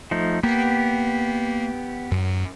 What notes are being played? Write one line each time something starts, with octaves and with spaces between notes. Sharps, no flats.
F3 A3 D#4
A#3 B3 G4
F#2